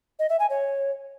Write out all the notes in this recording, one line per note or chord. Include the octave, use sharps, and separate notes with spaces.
D#5
E5
G#5
C#5